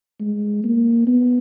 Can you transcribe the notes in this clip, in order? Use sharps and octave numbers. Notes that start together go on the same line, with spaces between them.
G#3
A#3
B3